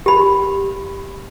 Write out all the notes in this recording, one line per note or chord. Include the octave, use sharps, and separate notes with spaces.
G4 B5